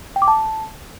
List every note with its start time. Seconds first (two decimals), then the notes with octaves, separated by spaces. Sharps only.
0.16 G5
0.22 D6
0.28 A5